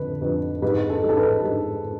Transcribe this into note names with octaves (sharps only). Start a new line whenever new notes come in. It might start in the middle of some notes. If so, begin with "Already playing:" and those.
Already playing: F2 D3 B4
F2 B4
G#2 B4
A4
G#2
A4
B4
G#2